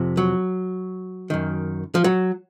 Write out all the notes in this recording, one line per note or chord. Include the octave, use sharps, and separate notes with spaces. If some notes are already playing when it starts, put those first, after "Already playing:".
Already playing: F2 C3
F#3
F#2 D#3
F3
F#3